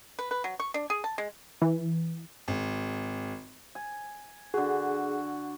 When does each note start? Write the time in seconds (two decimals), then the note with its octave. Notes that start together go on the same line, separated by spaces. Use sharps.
0.19 B4
0.31 B4
0.44 F#3
0.60 C#6
0.74 D4
0.90 G#4
1.04 A5
1.18 G#3
1.62 E3
2.48 G#1
3.75 G#5
4.54 D3 F#4 G#4